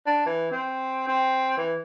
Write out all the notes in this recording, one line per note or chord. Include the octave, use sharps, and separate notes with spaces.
D4
E3
C4
C4
E3